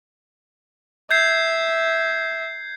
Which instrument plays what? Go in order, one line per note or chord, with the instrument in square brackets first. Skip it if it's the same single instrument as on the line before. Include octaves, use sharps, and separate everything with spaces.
[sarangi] E5 [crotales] G6 G#6 C7